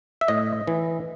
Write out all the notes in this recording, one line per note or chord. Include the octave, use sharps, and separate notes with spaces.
E5
A2 D#5
E3